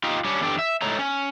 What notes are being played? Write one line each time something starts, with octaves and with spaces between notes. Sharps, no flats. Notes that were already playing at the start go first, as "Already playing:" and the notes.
D#4 F4 G4
G3 C#4 D4
E2 E3 D4 G4 A4 G5
E5
A2 G#3 A3 A4 C#5 A#5
C#4